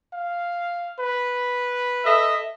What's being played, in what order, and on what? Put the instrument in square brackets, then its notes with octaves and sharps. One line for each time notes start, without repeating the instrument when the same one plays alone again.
[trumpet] F5
B4
[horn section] A4 D#5 E5